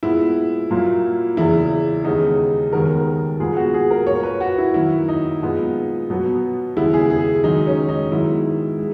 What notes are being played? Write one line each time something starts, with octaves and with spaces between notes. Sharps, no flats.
A#2 G#3 B3 E4
A#2 F#3 A#3
E2 C#3 E3 E4
D#2 C#3 G#3 B3 D#4
D#2 D#3 G#3 B3 A#4
A#2 G#3 B3 G#4
F#4
G#4
A#4
A#2 A#3 C#5
B4
F#4
E4
F#2 D#3 A#3 E4
D#4
A#2 G#3 B3
B2 F#3 B3
D#2 C#3 G#3 B3 E4
G#4
G#4
G#2 D#3 F#3 D#4
C#4
D#4
G#2 D#3 F#3 B3 E4
G#3